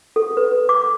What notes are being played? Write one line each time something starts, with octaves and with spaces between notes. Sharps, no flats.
A4
B4
D6